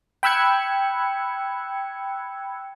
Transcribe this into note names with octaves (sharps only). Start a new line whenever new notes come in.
G5 B5 E6 F#6 G#6 C#7